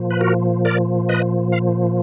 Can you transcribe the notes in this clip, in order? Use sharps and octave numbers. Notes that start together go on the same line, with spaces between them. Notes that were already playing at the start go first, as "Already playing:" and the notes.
Already playing: A#2 F3
B4
F#4 A#4
A#4 D5
B4 D#5
F5